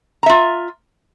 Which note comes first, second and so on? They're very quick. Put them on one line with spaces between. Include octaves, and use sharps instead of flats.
A#5 E5 F4